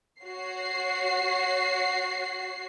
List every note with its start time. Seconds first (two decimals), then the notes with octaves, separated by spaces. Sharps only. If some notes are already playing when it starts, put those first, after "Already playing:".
0.21 F#4 C#5 C7